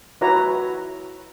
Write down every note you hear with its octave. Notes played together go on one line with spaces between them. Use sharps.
E4 F#4 B4 C#5 A#5